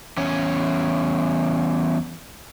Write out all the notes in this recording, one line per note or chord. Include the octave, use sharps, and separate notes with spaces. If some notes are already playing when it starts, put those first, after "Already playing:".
E2 C#4